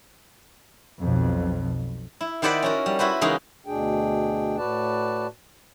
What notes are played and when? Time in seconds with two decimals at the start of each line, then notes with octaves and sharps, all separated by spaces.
1.00 B1 F2
2.21 E4
2.42 D#3 E4 C5 D5 F#5 B5
2.62 C#4 F#4 A#4
2.86 G3
2.99 E4 F#4 B4 C5
3.21 C#3 E3 G#3 A#3 D#4
3.66 D2 B2 D4 G#4 G5
4.57 A2 F#4 B4 D5 A5